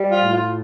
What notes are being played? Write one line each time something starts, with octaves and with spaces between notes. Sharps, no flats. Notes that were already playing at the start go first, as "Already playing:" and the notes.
Already playing: G3
F4
A2
F4